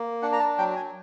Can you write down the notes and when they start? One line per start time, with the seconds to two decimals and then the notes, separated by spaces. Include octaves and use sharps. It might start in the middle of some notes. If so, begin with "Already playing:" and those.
Already playing: A#3
0.22 D4 F#5
0.32 A#5
0.40 A5
0.58 F#3 G5
0.76 G#5